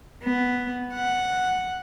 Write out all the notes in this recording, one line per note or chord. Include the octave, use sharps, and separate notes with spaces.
B3
F#5